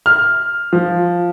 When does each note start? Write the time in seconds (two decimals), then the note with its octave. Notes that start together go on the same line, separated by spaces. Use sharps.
0.06 F6
0.73 F3